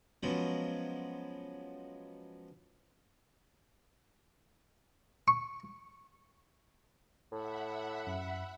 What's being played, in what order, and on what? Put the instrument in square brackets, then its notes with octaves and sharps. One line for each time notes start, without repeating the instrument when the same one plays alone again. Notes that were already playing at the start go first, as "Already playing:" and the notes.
[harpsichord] F3 F#3 G#3 B3 C#4
C#6
[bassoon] A2 [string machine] E5 F#5 B5
[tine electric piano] F#2